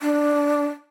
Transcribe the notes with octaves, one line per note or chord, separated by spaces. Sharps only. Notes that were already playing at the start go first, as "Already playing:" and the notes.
D4